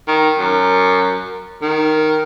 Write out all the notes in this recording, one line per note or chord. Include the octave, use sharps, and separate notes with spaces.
D#3
F#2
D#3